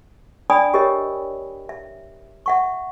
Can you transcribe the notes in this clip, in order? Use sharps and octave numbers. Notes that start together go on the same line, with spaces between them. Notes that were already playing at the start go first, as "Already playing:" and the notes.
D4 D5 G5 G#5 B5 D#6
G4 A#4 C#5 D#5
E5
E5 F#5 C#6